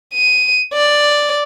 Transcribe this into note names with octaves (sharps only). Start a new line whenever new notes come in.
D#7
D5